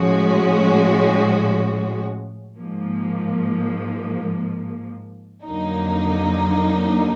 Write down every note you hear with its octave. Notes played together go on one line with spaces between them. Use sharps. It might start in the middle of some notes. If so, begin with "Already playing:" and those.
Already playing: A2 F3 G#3 C#4 F#4
G#2 F3 A#3
F2 D3 F#3 A#3 D#4